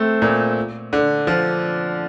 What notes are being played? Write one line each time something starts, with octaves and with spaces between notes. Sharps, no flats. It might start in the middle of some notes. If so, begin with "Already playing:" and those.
Already playing: A3 C4
A#2
D3
F3